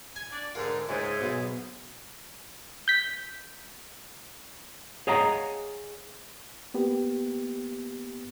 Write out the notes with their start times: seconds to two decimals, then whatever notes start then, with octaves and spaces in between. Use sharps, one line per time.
0.16 G#5
0.32 D4 D5
0.55 G#2 D3 F4 A#4 F#5
0.89 C#2 G#2 G#4 C5 E5 G#5
1.21 B1 B3
2.88 G6 B6
5.07 G#4 C#5 D#5 F5 F#5 A#5
6.74 A#3 B3 G4